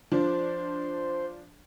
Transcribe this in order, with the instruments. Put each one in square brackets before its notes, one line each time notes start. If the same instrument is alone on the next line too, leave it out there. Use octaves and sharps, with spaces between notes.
[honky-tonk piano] F3 D4 [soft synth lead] C5